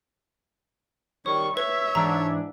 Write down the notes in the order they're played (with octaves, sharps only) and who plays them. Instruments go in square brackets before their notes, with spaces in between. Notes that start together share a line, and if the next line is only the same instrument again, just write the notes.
[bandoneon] D#3 G3 [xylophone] C#5 [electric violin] C#6
[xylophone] B4 [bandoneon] C#5 [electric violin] E5
[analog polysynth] G#2 E3 D4 [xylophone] A#5